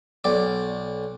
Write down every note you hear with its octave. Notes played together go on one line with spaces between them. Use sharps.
B1 D5